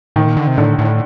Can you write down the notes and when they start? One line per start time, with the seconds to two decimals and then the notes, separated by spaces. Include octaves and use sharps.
0.16 A2 D#3
0.27 A#2
0.37 D3
0.47 C3
0.57 A2 D3
0.79 A2